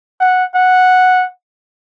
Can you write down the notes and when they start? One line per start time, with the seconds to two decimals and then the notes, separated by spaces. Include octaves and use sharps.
0.20 F#5
0.54 F#5